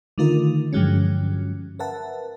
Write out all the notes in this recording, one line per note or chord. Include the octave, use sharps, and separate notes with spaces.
D3 D#3 A3 D#4 F4 A#4
G2 D3 F3 F#3 G#3 C#4
A#4 B4 E5 F#5 A5